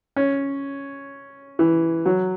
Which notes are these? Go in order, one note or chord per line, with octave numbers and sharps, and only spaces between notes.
C#4
E3
F#3